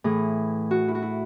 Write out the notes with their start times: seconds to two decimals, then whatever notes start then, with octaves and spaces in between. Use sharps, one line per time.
0.04 A2 E3 G#4
0.71 F#4
0.88 E4
0.95 F#4
1.02 E4